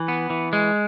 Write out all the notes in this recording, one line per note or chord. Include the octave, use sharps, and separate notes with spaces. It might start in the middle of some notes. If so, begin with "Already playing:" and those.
Already playing: E3
B3
E3
G#3